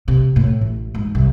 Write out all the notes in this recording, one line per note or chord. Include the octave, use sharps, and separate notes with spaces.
C3
A2
A1
G#2
C2